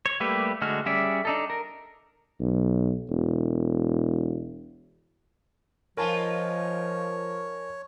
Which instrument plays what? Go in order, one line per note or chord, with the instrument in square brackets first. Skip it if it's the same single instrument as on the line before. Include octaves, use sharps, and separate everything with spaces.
[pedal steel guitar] C#5
G3 A3 A#3 G4 B4
D3 G#3 A3 F#4 F6
G3 C#4 G#4 D5 E5
D4 D#4 A4
A#4
[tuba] B1
E1
[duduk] F3 [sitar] D#4 F4 B4 [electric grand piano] A#4 G#5 A5 [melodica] C#5